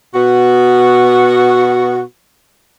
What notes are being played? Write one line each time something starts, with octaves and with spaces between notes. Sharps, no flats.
B2 B3 F#4